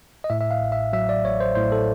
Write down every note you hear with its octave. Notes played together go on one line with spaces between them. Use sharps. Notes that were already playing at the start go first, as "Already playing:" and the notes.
D#5
A2 E5
E5
F5
A1
E5
F#3 E5
D5
A1 C#5
C5
A2 C5
A4